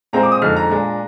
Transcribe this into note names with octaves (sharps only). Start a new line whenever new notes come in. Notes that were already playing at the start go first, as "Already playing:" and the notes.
A#2 G#3 C4 A#5
D6
D#6
F2 D3 G#3 D#4 F6
A#5
A#2 G#3 D4